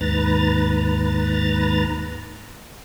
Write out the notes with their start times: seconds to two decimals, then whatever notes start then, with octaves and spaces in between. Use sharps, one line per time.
0.01 D#2 G#2 B4 A#5 A6